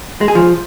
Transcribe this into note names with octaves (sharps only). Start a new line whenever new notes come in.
G#3
G#4
F3